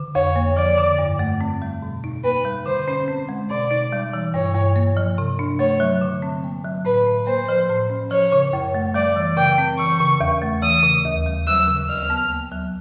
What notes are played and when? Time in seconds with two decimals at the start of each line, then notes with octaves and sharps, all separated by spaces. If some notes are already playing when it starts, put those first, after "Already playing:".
Already playing: D3
0.15 F2 C#5
0.36 A#3
0.57 F3 D5
0.78 D3
0.98 G2
1.19 A3
1.41 C4
1.62 G3
1.82 B2
2.04 D#4
2.24 A#3 B4
2.45 G3
2.66 D3 C5
2.88 C#4
3.08 C4
3.29 G#3
3.50 B2 D5
3.71 D#4
3.93 G3
4.13 E3
4.34 G2 C#5
4.55 G2
4.76 A#3
4.97 F3
5.18 C3
5.39 D4
5.59 A3 C#5
5.80 F#3
6.01 D3
6.22 C4
6.44 A#3
6.65 F#3
6.85 A2 B4
7.06 A2
7.27 A#3 C5
7.49 F3
7.69 A2
7.90 C#4
8.11 F3 C#5
8.32 C#3
8.53 F#2
8.74 A3
8.94 G3 D5
9.16 E3
9.37 C#3 G5
9.58 C4
9.79 E3 C#6
10.00 C#3
10.21 E2
10.42 A3
10.62 E3 D#6
10.83 C#3
11.05 D#2
11.26 G3
11.47 F#3 E6
11.68 C#3
11.89 D2 F6
12.10 B3
12.30 A#3
12.51 F#3